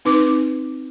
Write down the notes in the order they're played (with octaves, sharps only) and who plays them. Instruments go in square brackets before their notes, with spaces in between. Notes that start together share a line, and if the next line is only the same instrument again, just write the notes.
[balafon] C4 D#4 B4 D6